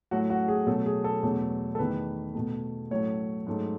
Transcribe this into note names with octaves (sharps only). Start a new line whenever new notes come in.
A2 F#3 A3 F#4
F#4
G#4
B2 F#3 A3 A4
G#4
A4
E2 B2 F#3 A3
A4
E2 D#3 A3 B4
B2 A3
A2 F#3 A3 C#5
G#2 F#3 A3